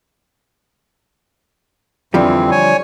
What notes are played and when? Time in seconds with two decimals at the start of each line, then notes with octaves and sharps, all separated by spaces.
2.14 F2 D3 E3 F3 G3 C4
2.52 C#5 G#5